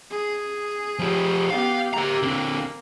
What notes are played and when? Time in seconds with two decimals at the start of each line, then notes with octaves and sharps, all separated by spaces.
0.10 G#4
0.99 F3 G4
1.50 B3 G4 F5
1.94 A#3 G4 A#5
2.23 D3 C4